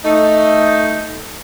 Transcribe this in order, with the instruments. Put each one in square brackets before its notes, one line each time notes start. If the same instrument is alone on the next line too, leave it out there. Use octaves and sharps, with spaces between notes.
[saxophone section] A3 D#4